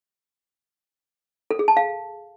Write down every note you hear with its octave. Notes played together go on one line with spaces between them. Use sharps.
A4
G#4
A5
F5